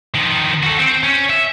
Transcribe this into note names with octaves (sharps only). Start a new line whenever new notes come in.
D#3 F3
F#4 A4
C4
C#4
E5